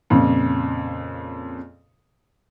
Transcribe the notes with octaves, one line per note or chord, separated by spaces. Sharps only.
F2 A#2 C#3